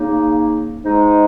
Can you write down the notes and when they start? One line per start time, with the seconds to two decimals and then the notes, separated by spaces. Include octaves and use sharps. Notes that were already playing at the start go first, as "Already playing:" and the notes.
Already playing: C#3 A#3 D#4
0.82 G#2 G#3 D#4